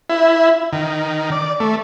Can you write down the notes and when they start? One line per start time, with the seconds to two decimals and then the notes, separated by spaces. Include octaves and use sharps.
0.10 E4
0.73 D#3
1.32 D5
1.60 A3